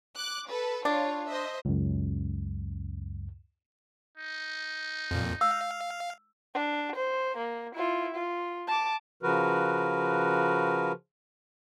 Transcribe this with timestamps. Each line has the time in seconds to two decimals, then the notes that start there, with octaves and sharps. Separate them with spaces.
0.17 D6 F#6
0.48 A4 B4
0.85 D4 F4 C#5
1.26 C5 D#5 E5
1.65 C#2 F#2
4.17 D#4
5.11 F2 A#2
5.41 F5 E6
6.54 D4
6.95 C5
7.37 A#3
7.75 E4 F4
8.15 F4
8.67 A5 D6
9.23 C#3 F3 F#4 A#4 B4